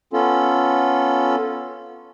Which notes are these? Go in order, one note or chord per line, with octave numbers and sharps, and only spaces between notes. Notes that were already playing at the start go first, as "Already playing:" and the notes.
B3 C#4 F4 A4